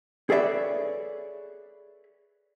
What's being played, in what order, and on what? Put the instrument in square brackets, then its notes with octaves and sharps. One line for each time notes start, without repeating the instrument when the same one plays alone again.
[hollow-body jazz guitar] G#4 A4 B4 C#5 D5 E5